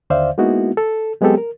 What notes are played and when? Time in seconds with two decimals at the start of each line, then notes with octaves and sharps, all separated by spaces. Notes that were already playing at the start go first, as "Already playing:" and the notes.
0.10 D#2 D3 C5 D5 E5 F5
0.38 G#3 A#3 B3 D#4 E4 F#4
0.77 A4
1.21 F#3 G#3 B3 C4 G4 A4
1.38 A#4